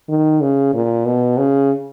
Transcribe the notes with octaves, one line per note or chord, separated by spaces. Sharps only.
D#3
C#3
A#2
B2
C#3